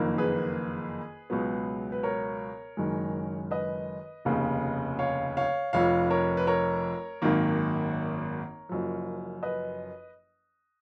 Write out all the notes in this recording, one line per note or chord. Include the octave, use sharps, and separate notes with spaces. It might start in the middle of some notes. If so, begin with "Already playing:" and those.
Already playing: F#1 F2 D#3 A#3
G#4 B4
C#2 B2 F#3 B3
B4
A#4 C#5
F#1 F#2 D#3 G#3
B4 D#5
F1 D#2 C#3
C#5 F5
C#5 F5
F1 F2 F3 C#5 F5
A#4 C#5
B4
A#4 C#5
G#1 F#2 D#3 A#3
F#1 F#2 F3
B4 D#5